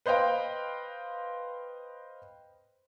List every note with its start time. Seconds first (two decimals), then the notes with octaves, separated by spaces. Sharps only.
0.06 B4 C5 D#5 F5 G5